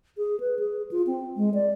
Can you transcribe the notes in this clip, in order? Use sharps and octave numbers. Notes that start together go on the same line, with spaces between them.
G#4
B4
G#4
F4
C4
G#3
D5